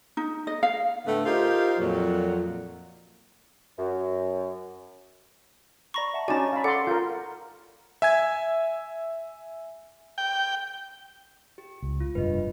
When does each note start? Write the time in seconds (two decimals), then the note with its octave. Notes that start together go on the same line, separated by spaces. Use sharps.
0.17 D#4
0.47 D#5
0.63 F5
1.05 A2 D3 A3 B3
1.25 D#4 F4 G4 A#4 C5 F5
1.79 F2 A#2 F#3
3.79 F#2
5.94 D5 A#5 B5 C#6 A#6
6.14 E5 F#5 A5
6.28 C#4 D#4 F#4 D5 G#5 A5 A6 A#6
6.53 F5 B5
6.64 A4 D5 F#5 C6
6.87 F4 A#4 G6
8.02 E5 G#5 G#6
10.18 G5
11.58 G4
11.82 C#2
12.00 F4
12.15 F1 G2 A#2 B4 D#5